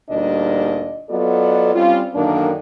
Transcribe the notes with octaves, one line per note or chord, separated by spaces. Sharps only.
D2 A#2 G3 D4 D#4 D#5
F#3 B3 F4 A4 D5 D#5
G3 C4 C#4 F4
F#2 D3 D#3 A#3 D4